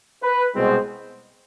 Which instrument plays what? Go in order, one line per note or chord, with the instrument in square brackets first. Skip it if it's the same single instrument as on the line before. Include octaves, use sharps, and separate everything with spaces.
[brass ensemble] B4
C2 B2 G#3 C4